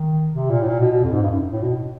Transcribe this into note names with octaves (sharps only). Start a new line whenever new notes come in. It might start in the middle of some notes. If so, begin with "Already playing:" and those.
Already playing: D#3
C3
A#2
A2
A#2
B2
B2
F2
G#2
G2
F#2
A2
B2